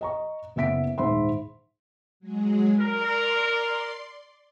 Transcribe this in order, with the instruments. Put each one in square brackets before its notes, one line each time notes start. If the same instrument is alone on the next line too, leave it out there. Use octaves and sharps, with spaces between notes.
[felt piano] D#5 A#5 C#6
F#1 B3 E5 B6 D7
D#1 G#2 C5 E5 B5 C6
[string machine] F#3 G#3 G#4
[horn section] A#4 [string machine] D5 C6